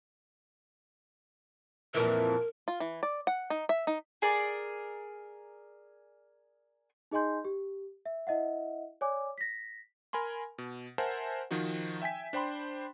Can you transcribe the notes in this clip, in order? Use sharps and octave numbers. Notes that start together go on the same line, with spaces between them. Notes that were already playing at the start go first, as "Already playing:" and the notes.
F2 A#2 E3 A#4
F4
E3
D5
F#5
D#4
E5
D#4
G#4 A#4 D5
D#4 G#4 D#5 G#5 C6 G6
G4
E5
E4 D#5 E5 F#5
C#5 D5 G#5 D6
A#6 B6
A#4 G#5 B5 C6
B2
A#4 C5 E5 F#5 G#5 A5
D#3 F3 D#4 F#4
E5 G5 G#5 B6
D4 C5 G5 B5 C6